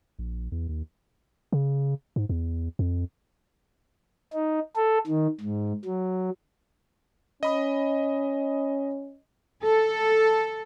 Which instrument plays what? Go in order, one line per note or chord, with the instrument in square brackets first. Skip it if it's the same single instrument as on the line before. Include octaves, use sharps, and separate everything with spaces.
[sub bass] A#1
E2
D#2
C#3
G#2
E2
F2
[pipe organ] D#4
A4
D#3
G#2
F#3
[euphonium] C#4 [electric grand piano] D#5 B5 D#6
[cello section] A4